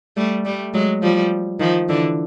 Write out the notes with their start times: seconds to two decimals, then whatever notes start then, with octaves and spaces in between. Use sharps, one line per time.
0.17 G3 A3
0.45 G3 A3
0.74 F#3 G#3
1.02 F3 G3
1.60 D#3 F3
1.89 D3 E3